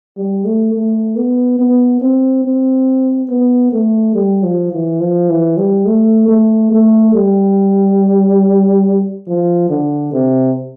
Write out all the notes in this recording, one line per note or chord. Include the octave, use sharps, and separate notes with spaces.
G3
A3
A3
B3
B3
C4
C4
B3
A3
G3
F3
E3
F3
E3
G3
A3
A3
A3
G3
F3
D3
C3